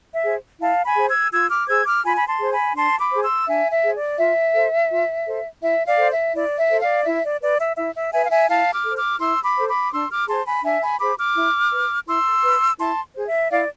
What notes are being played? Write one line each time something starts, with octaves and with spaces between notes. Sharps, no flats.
E5
G#4 C5
E4 F5 A5
G#5 B5
G#4 C5
E6 G#6
F4 E6 G#6
D6 F6
G#4 C5 E6 G#6
D6 F6
F4 G#5 B5
B5
A5 C6
G#4 C5
G#5 B5
D4 A5 C6
B5 D6
G#4 C5
C6 E6
D4 E5 G#5
E5
G#4 C5
D5
F4 E5
A4 C5
F4
A4 C5
E4 E5
D5 F5
A4 C5
E5
E4 D5
E5
A4 C5
D5 F5
E4 E5
D5
B4 D5
E5
E4 E5
E5
B4 E5 G#5
F5
E5 G#5
E4 F5 A5
D6 F6
A4 C5
D6 F6
E4 C6 E6
B5 D6
A4 C5
B5 D6
D4 C6 E6
D6 F6
G#4 C5 A5 C6
G#5 B5
D4 E5 G#5
G#5 B5
G#4 C5 B5 D6
D6 F6
E4
B4
E4 C6 E6
B4
E4 A5 C6
G#4 C5
E5
E4 D5 F5